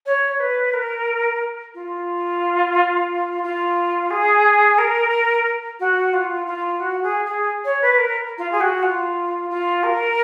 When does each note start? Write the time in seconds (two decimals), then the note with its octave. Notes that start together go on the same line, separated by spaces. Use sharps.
0.05 C#5
0.39 B4
0.73 A#4
1.74 F4
3.43 F4
4.10 G#4
4.78 A#4
5.79 F#4
6.13 F4
6.46 F4
6.79 F#4
7.02 G#4
7.25 G#4
7.64 C#5
7.81 B4
7.97 A#4
8.37 F4
8.51 G#4
8.60 F#4
8.82 F4
9.49 F4
9.83 A#4